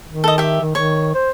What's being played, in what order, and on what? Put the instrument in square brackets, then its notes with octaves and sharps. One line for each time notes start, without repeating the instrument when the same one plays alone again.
[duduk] D#3
[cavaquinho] A4 D#5
G4 E5
[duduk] D#3
[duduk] D#3 [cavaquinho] C#5
[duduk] C5